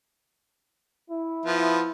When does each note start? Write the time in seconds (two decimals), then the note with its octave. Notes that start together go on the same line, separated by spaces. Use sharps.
1.10 E4
1.45 F3 B3